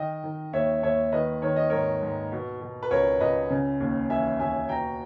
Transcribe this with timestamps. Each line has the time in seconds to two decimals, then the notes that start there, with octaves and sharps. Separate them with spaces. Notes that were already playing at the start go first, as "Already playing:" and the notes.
Already playing: D#3 D#5 G5
0.24 D#3
0.53 D#2 C#5 E5
0.83 D#2 C#5 E5
1.12 D#3 B4 D#5
1.42 D#3 C#5
1.56 D#5
1.69 G#2 A#4 C#5
2.02 G#2
2.32 B2
2.61 B2
2.83 B4
2.91 C#2 A#4 C#5
3.20 C#2 B4 D#5
3.50 C#3
3.80 D#2
4.09 E3 E5 G#5
4.40 D#2 E5 G#5
4.69 B2 G5 A#5